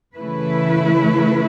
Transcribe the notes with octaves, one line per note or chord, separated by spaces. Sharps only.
C#3 E3 A3 E4 B4